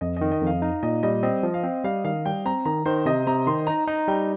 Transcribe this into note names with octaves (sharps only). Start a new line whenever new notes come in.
F2 D#5
D#3 D#5
D#5
F2
F5
D#4 F5
A#2 D#5
G3 D#5
C4 D#5
F3
F5
C4
G3 F5
D#3 F5
G3 G5
C4 A#5
D#3 A#5
D#3 C5
C3 D#5
C3 A#5
D#3 C6
D#4 A#5
D#4 A#5
G3 G5